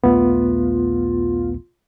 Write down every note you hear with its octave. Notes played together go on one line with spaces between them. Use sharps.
A#1 D#2 A3 B3 F4